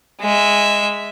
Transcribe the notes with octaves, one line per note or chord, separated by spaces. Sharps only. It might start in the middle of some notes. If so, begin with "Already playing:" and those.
G#3 E5